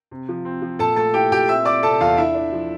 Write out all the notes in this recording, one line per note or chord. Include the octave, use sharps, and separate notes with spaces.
C3
F3
C4
F3
A#2 A4 A5
A3 A4 A5
E4 G4 G5
A#2 G4 G5
C4 E5 E6
C4 D5 D6
C3 A4 A5
E2 F4 F5
D4 E4 E5
D4
F3